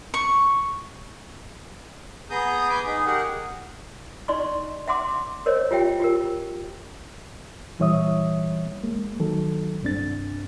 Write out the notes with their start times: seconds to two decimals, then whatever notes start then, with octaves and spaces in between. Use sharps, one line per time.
0.14 C#6
2.30 B3 G#4 A#5 D#6 G6
2.69 B4 G#5 D6 G6
2.86 D#4 G#4
3.06 G4 G#4 A#4 F#5
4.28 D#4 D5 D#5 C6 C#6
4.88 E5 F#5 C6 D6
5.46 A#4 C5 C#5 D#5
5.71 F4 G4 E5 G5
6.00 F4 G4 A#4
7.79 A#2 E3 G3 C#5 E5 D#6
8.84 G#3 A#3
9.20 D#3 F#3 A4
9.83 C2 G2 C4 D4 A6